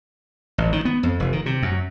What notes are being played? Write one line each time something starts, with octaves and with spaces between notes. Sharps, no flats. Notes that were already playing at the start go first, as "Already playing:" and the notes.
A1
D#3
B3
F2
F1
D#3
C3
F#2